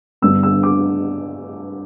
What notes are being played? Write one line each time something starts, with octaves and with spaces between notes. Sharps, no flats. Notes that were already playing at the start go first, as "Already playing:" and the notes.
G2 D3 G3 B3 E6
E6
D6